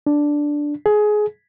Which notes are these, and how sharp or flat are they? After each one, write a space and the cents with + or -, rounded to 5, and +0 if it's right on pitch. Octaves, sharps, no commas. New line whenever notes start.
D4 +0
G#4 +20